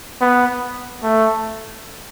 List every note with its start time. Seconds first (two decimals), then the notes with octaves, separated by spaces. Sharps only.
0.21 B3
1.03 A3